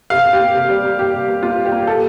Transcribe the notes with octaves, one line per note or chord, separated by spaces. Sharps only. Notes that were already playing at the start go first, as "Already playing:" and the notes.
C3 F5
C3
G4
A#3
C3
G3
A#3
G3 G4
C3
A#3
A#3 F4
G3
G4
A#3
A#2 A4